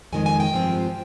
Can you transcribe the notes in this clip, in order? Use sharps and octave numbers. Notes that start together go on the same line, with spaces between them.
F2 D#3 G#3 G#5
G#5
G5
G2 F3 G#3 C4 F4